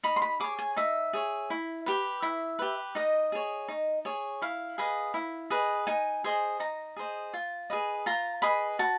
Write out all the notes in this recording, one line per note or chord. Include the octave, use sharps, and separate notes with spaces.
D#4 B5
C6
B5
G#4 C#5 D6
G#5
D#4 E5
G#4 C#5
E4
G4 B4
E4 E5
G4 B4
D#4 D#5
G#4 C#5
D#4
G#4 C#5
E4 F5
G#4 B4 D#5
E4
G#4 B4 D#5
D#4 G#5
G#4 C5 D#5
D#4 A#5
G#4 C5 D#5
F4
G#4 B4 D#5
F4 A#5
G#4 B4 D#5 B5
F#4 A5